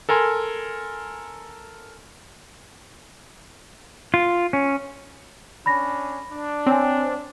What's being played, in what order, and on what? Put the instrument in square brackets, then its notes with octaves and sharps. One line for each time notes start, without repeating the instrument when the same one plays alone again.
[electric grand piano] A4 A#4 G#5 C6
[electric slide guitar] F4
C#4
[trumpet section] C#4 D4 [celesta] B5 A#6
[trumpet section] D4
[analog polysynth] C4 [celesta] C#5 G#5